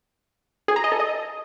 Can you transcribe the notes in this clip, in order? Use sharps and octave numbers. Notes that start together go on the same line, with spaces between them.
G#4
A#5
D#5
A4
D#5